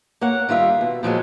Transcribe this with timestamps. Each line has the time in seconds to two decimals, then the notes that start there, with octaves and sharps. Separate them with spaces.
0.21 A#3 C#5 F#5
0.49 D#3 G3 F4 E5
0.81 B2
1.03 A#2 F3 F#3 G#3